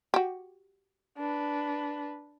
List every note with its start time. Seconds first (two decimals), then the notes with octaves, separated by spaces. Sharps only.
0.14 F#4 G4
1.17 D4 B4